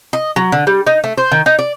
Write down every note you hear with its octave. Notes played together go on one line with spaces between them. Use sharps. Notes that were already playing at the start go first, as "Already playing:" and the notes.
D#5
F#3
D3
G3
D#4
A3
C5
D#3
D#4
D5